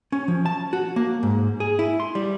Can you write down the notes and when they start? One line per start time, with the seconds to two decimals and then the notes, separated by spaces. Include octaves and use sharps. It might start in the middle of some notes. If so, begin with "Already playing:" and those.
0.12 C#4
0.28 F3
0.46 A5
0.73 F#4
0.96 A#3
1.23 G#2
1.60 G#4
1.79 E4
2.00 C6
2.15 G3